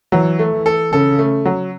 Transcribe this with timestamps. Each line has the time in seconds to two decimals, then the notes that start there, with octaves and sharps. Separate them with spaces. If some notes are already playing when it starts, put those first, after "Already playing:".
0.12 E3 F#3
0.39 A3
0.52 E3
0.66 A4
0.92 C#3 A4
1.19 A3
1.45 F#3